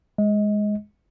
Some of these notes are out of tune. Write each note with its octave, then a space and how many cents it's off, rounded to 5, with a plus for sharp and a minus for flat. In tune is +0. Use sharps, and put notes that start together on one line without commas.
G#3 +0 D#5 +25